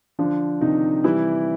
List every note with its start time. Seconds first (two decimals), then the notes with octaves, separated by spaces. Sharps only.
0.19 D3 F3 D4
0.61 C3 D#3 D#4
1.04 E3 G3 E4